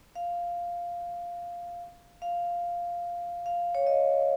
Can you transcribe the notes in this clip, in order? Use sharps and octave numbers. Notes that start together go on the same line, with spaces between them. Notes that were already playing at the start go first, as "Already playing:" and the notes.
F5
F5
F5
C#5
D#5